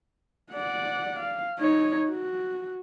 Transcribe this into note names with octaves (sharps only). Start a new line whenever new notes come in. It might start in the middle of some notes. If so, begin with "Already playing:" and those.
D5 F#5
F5
D#4 C#5
F#4